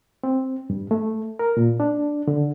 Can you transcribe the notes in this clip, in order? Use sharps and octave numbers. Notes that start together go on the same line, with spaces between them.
C4
G2
A3
A#4
A#2
D4
D3